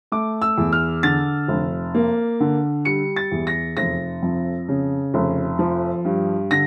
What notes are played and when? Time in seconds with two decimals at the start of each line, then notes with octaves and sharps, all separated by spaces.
0.12 A3 D6
0.42 E6
0.58 E2
0.73 F6
1.03 D3 A6
1.48 F1
1.95 A#3
2.40 D3
2.85 G3 C#7
3.16 A6
3.32 E2
3.47 A#6
3.77 F1 A#6
4.23 F2
4.68 C#3
5.14 F1
5.59 F3
6.05 G2
6.51 D3 A#6